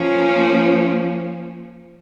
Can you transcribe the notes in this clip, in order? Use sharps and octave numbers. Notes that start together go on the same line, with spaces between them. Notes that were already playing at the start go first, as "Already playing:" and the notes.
Already playing: F3 A#3 C#4